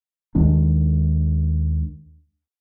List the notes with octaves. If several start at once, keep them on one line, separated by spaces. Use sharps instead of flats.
D#2 D#3 G#3 D4